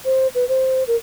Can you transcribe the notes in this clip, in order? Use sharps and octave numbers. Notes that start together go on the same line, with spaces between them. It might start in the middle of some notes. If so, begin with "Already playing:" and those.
C5
B4
C5
A#4